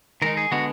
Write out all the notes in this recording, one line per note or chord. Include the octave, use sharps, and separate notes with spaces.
D#3 G#3 D#4 A#4
G#4
D3 G#3 B3 F#4